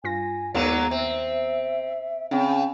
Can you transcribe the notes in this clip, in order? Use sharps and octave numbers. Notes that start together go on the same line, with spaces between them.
G2 F4 G#5 A#6
D#2 G#2 F#3 A#3 B3 D5 D#7
C4 E5
C#3 C4 C#4 G5